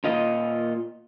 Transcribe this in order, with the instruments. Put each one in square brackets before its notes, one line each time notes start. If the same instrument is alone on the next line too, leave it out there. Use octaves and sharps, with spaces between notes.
[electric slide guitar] A#2 F4 D#5